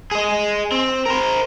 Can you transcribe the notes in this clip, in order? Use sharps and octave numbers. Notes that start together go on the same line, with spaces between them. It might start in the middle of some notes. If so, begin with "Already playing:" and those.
G#4 D#5
C4
A#4 C5